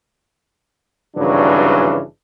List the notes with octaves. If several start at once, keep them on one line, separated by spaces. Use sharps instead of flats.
G#1 G2 C#3 E3 F#3 D4